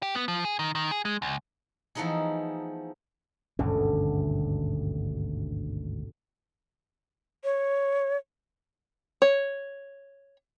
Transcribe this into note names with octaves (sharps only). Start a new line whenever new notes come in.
G4
B3
F3
G#4
D#3
D#3
G#4
G#3
C#2
E3 F3 A3 B3 D#4 G#4
G#1 D2 G2 B2 D3 C#4
C#5
C#5